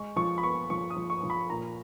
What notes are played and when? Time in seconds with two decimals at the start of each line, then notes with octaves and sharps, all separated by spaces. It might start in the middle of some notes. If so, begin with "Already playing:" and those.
Already playing: G#3 C#6
0.16 F3 C#6
0.38 B5
0.43 B3 C#6
0.70 F3 C#6
0.90 D#6
0.96 F3
1.10 C#6
1.23 F3
1.30 B5
1.50 A#2 A#5